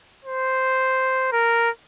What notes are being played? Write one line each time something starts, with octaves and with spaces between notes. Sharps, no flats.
C5
A#4